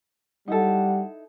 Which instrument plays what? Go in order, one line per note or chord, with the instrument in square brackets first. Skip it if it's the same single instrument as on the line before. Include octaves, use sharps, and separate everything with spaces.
[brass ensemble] G3 F#5 [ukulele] D#4 E4 A4